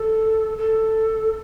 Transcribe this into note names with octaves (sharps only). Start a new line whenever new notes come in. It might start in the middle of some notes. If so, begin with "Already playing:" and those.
Already playing: A4
A4